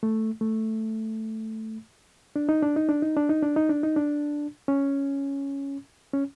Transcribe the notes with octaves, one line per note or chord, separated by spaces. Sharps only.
A3
A3
D4
D#4
D4
D#4
D4
D#4
D4
D#4
D4
D#4
D4
D#4
D4
C#4
C#4